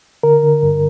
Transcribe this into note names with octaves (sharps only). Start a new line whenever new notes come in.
D3 A#4
D3
G2